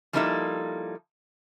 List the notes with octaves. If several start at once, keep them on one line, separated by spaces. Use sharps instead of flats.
F3 G3 A#3 D#4 E4 A4